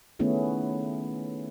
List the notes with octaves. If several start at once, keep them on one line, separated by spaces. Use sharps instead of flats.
D#3 A3 B3 C#4 E4 G#4